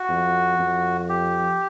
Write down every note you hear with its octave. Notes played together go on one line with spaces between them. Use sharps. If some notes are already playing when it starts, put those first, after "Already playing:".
Already playing: F#4
F2
F2
G4